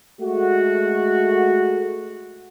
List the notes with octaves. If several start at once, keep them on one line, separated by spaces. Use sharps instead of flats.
G#3 A3 F#4